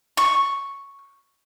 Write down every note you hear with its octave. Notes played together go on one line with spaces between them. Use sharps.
C#6